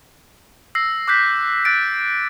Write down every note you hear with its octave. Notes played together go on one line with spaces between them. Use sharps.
E6 A#6 C7
D6 F#6 G6 B6
F#6 A6 D7